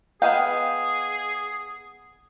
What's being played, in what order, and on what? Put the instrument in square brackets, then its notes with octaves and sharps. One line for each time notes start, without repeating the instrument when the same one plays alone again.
[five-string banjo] B3 D#5 G5 [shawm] G#4 [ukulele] F5